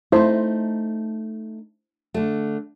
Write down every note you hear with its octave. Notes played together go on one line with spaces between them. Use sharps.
A3 D#4 E4 C5
D3 A3